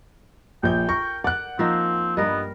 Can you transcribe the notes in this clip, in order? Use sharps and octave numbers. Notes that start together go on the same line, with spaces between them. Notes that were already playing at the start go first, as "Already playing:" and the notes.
A#1 G5 G6
A#4 C#6
D5 F#5 F#6
F3 A#3 C4 D#4
G2 G3 B3 A#4 D#5